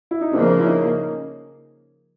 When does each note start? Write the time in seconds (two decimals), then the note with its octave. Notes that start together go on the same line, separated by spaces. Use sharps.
0.11 E4
0.21 D#4
0.33 C#3 F3 A#3 C4 D4
0.60 E4
0.65 C#4 D#4